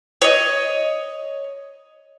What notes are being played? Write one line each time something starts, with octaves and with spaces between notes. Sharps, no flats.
C#5 D#5